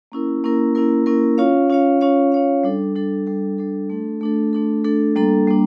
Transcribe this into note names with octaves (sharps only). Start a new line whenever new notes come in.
A#3 C#4 E4 A#4
A#3 C#4 E4 A#4
A#3 C#4 E4 A#4
A#3 C#4 E4 A#4
C#4 F4 C#5 F5
C#4 F4 C#5 F5
C#4 F4 C#5 F5
C#4 F4 C#5 F5
G3 D4 A4
G3 D4 A4
G3 D4 A4
G3 D4 A4
A3 D4 A4
A3 D4 A4
A3 D4 A4
A3 D4 A4
G3 A#3 D4 A4
G3 A#3 D4